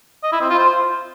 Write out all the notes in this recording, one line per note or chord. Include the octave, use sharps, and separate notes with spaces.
D#5
E4
C4
F4
C5